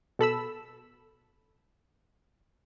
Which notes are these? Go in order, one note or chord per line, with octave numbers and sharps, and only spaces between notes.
B2 A4 B5 E6